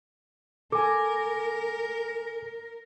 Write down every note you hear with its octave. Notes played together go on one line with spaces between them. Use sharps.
A4 A#4 G#5 D6